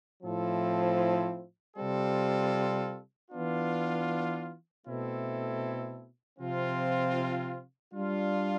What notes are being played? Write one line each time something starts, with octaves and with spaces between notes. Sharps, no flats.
A2 F3 C4 E4 A4
C3 G3 C4 F4 A4
E3 B3 D4 F4
B2 A3 C4 E4 A4
C3 F3 C4 F4
G3 D4 F4